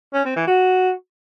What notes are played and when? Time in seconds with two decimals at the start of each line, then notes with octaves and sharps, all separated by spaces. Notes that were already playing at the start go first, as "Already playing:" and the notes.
0.14 C#4
0.25 C4
0.36 E3
0.47 F#4